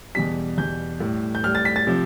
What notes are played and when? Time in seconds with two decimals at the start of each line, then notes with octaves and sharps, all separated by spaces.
0.15 E2 B2 G3 B6
0.58 E2 B2 G3 G6
1.00 A2 G3
1.35 G6
1.44 A2 G3 F6
1.55 A6
1.65 B6
1.76 A6
1.87 C3 F3